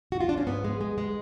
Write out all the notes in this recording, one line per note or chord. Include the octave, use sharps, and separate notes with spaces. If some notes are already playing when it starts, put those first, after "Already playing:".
F#4
F4
D4
C#4
G#2 B3
G#3
G#3
G#3